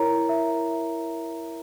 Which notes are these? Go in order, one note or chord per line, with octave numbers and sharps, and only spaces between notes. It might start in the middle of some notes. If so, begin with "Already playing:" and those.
Already playing: E4 A#4 C#5 A#5
E5